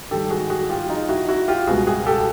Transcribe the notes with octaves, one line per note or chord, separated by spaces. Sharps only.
G#2 D#3 G3 G4 A4
F#4 G#4
F#4 G#4
F4 G4
D#4 F4
E4 F#4
E4 F#4
F4 G4
C#2 B2 G3 F#4 G#4
F#4 G#4
G4 A4